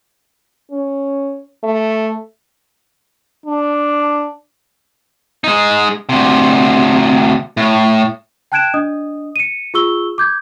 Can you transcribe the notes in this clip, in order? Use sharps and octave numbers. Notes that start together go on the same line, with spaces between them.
C#4
A3
D4
G#3 D#4
D2 C3
A2
G5 A5 F#6 G#6 D7 E7
D4 D#5 D#6
C#7 D#7
F4 G#4 C#6 E6 G7
D6 G6 G#6